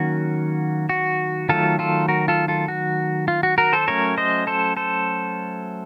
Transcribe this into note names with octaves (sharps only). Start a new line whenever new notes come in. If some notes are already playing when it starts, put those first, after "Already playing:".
Already playing: D#3 F#3 A#3 C#4 F#4
F#4
D#3 F#3 A3 F4 A4
F4 A4
F#4 A#4
F4 A4
F4 A4
F#4
F4
F#4
F#4 A#4
A4 C5
F#3 A3 C#4 A#4 C#5
C5 D#5
A4 C5
A4 C5